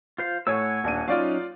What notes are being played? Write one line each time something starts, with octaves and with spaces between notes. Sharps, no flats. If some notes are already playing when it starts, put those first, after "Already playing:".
F4 C5 F5
A2 C#5 F#5 G#5 E6
D#1 D4 D#7
F#3 C#4 D#4 F4 D5 F5